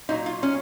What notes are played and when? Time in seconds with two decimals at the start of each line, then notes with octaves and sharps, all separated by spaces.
0.09 A#2 F#3 D#4
0.26 F4
0.43 C#4